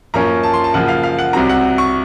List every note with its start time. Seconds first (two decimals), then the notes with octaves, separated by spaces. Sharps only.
0.14 F#2 F3 A#3 C#4 A#5
0.43 A5
0.53 C6
0.64 A5
0.74 F#2 C#3 F3 A#3 F#5
0.88 F5
1.03 F5
1.18 F#5
1.33 C2 C3 F#3 C4 A#5
1.49 F#5
1.78 C#6